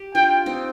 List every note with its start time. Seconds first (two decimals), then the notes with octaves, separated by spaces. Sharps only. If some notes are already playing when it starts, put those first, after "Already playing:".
Already playing: G4
0.15 D4 F4 G5
0.46 C4 D#4